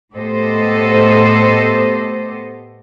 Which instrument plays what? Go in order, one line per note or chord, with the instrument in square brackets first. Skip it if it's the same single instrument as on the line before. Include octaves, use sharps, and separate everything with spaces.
[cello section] A2 B3 G4 A4 C5 D#5